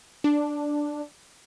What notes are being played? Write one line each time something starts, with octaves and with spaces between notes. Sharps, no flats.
D4